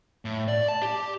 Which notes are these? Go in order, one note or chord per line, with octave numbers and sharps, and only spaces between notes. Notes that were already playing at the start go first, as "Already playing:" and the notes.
A2
D5
A5
G4